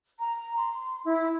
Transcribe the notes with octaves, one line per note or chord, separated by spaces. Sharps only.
A#5
C6
E4